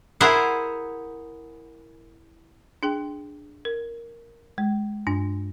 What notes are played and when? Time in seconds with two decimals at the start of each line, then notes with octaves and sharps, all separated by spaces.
0.21 E4 G#4 A#4 C5 F#5
2.83 D4 G#4 G5
3.65 A#4
4.58 G#3
5.07 G2 D4